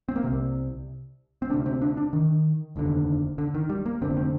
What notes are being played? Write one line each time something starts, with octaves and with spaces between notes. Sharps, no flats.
C4
A#3
C2 C3 C4
C4
D2 C3 D4
C4
D4
D4
D#3
F1 D#2 D3
D3
D#3
G3
A#3
F1 D#2 D3 C4
C4